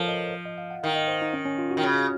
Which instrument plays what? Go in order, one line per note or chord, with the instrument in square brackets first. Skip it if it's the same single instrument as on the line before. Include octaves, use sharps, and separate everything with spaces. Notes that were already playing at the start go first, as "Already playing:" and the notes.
Already playing: [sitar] F3 [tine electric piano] A4 A#4 C5 C#5 F5
[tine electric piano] D#5
D#5
F5
F#5
[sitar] D#3 [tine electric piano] F5
[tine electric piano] D#5
C5
D#4
C#4
C#4
F4
F#4
[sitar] D#3
C#3